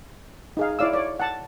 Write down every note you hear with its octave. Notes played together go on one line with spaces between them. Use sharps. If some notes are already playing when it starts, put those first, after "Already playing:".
D#4 G#4 F5
E4 C#5 D5 F5 E6
C#5 D5
F#5 A5